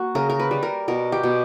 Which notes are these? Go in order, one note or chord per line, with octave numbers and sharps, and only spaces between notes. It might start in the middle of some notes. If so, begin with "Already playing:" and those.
Already playing: A#3 F#4
C#3 A#4
A#4
B4
G3
A#4
B2 A#4
G4
B2